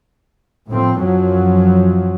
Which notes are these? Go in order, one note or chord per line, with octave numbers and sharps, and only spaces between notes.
A2 F3 C4
F#2 F3 F#3